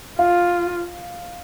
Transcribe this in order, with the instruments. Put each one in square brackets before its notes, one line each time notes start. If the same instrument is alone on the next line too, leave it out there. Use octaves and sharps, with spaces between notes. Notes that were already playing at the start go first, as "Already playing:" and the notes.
[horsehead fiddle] F4 [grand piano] F5